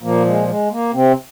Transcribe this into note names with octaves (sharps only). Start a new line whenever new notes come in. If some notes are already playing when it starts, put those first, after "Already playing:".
A#2 F3 A#3
G#3
G#3
A#3
C3 C4